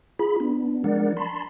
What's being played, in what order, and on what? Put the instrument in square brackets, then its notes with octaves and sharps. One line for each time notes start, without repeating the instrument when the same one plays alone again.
[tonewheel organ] F4 G#4 B5
B3 D4
F3 G#3 D4 A#4 D5 F#5
A5 B5 C6